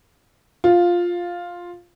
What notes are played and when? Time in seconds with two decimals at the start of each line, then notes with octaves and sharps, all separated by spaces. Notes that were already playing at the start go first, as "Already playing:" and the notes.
0.64 F4